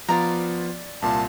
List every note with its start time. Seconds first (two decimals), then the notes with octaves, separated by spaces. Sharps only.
0.08 F3 B3 F4 D5 A#5
1.02 C2 A#2 F4 A5